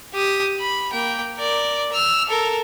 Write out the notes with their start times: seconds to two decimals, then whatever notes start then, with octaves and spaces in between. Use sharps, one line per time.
0.14 G4 D#6
0.60 B5
0.92 A#3 G5
1.38 A#4 D5
1.92 E6 F6
2.29 A4 A#4